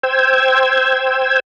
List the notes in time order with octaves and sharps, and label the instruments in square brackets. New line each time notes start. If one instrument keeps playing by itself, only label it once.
[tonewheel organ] C5 G5 E6 G#6